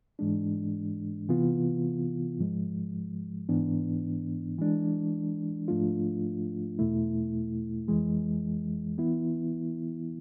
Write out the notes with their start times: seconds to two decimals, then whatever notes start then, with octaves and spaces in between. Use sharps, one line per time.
0.19 G#2 E3 G#3 D4
1.29 C3 E3 B3 F4
2.39 G#2 F3 G#3
3.49 G#2 E3 B3 D4
4.58 E3 G#3 D4
5.68 G#2 F3 A3 D4 F4
6.79 E2 B2 A3 E4
7.88 F2 E3 G#3
8.98 E3 B3 E4